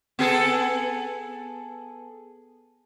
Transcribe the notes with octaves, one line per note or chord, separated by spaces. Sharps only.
B3 G#4 A4